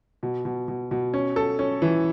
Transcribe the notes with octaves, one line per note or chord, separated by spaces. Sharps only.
B2
B2
B2
B2
C#4
A4
C#4
E3